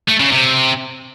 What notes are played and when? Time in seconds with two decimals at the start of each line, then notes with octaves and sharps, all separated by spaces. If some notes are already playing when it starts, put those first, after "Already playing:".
0.08 A3
0.20 C#3
0.32 C3